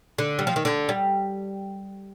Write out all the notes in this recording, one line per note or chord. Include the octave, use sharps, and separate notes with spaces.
D3
G3
F3
D#3
D3
G3